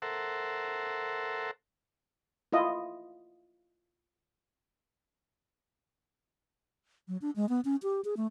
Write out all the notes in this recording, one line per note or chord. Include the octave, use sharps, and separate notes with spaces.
A4 A#4 C5 E5 F#5
E4 F4 D#5
F#3
D4
G#3
B3
C#4
G4
G#4
A3